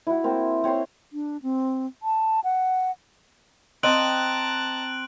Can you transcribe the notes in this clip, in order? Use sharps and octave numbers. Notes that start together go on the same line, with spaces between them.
E4 F#4
A#3 C4
C4 C#5 A#5 C6
D4
C4
A5
F#5
C4 D#5 A5 A#5 F#6 D7 F#7